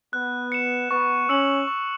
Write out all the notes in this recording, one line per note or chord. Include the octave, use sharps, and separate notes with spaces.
B3 F#6
C#7 E7
B3 C#6
C#4 E6 C#7 F#7
C#6